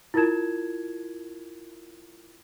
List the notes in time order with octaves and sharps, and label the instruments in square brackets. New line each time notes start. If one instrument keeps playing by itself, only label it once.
[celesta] E4 F4 A#4 A5 G#6 E7